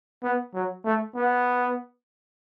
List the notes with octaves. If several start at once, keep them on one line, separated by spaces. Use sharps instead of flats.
B3
F#3
A3
B3